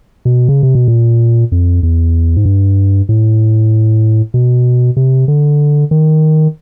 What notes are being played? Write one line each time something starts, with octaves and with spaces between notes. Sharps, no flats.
B2
C#3
C3
B2
A#2
F2
E2
G#2
G2
A2
B2
C3
D3
D#3